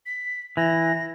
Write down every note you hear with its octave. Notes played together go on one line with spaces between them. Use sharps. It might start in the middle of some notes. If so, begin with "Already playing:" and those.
B6
E3 A#6